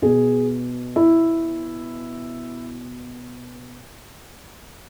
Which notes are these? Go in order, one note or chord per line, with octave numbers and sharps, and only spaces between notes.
B2 G#4
E4